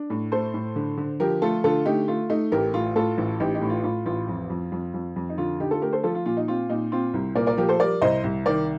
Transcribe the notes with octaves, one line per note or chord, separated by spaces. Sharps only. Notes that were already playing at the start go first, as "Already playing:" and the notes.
Already playing: D4
A2
A3 A4 C5
A2
D3
D3
F3 G4 A#4
A3 F4 A4
D3 F4 A4
A3 D#4 G4
A3 F4
A3 D#4
A1 G4 A#4
A2 F4
A2 F4 A4
A1
A1 D#4 G4
D#4 G4
A2
F4
A2 F4
A1 F4
F2
F2
F2
F2
F2
D#4
D3 F4
D3 D#4 G4
F4 A4
A3 G4 A#4
A4 C5
F3 F4 A4
F4
A#2 F4
D#4
C4 F4
A#2 D#4
C4 F4
C2
A#2 A#4 D5
A#4 D5
F3 G4 A#4
A4 C5
G3 A#4 D5
C2 C5 D#5
C2
D#3 A#4 D5